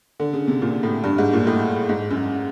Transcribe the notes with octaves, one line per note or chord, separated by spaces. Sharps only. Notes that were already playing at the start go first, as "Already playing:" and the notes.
D3
C#3
C3
A#2
A2
G2
G#2
A#2
A2
G#2
F#2